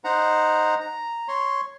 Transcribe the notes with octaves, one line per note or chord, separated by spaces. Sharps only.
D#4 C5 F#5 A#5
A#5
C#5 C6